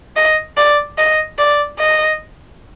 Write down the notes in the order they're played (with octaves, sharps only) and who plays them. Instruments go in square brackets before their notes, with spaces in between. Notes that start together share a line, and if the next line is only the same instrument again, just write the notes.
[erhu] D#5
D5
D#5
D5
D#5